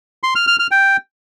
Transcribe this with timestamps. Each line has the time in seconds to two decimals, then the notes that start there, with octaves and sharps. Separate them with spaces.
0.23 C6
0.35 F6
0.47 F6
0.59 F6
0.71 G5